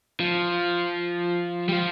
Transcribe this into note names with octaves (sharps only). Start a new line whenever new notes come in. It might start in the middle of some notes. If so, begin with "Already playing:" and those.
F3
G3
F3